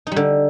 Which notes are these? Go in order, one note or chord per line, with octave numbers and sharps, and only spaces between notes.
D3 G3 D#4